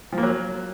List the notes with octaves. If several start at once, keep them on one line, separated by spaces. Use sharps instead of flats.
F3
A#3
F#3